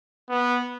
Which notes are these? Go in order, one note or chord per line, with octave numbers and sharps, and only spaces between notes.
B3